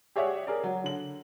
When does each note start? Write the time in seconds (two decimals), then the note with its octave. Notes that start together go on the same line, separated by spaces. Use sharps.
0.16 G4 G#4 C#5 D5 E5 F#5
0.47 G#4 A#4 D5
0.63 F#3
0.84 D3 F#7